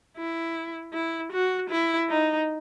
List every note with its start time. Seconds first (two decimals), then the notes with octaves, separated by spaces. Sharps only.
0.17 E4
0.93 E4
1.32 F#4
1.70 E4
2.09 D#4